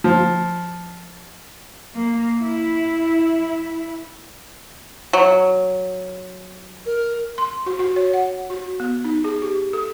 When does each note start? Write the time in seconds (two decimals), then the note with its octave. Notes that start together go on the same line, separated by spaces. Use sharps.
0.04 F3
1.97 A#3
2.40 E4
5.13 F#3
6.85 A#4
7.38 C6
7.66 F#4
7.79 F#4
7.96 C#5
8.13 F#5
8.50 F#4
8.80 B3
9.05 D#4
9.24 G#4
9.42 G4
9.73 A4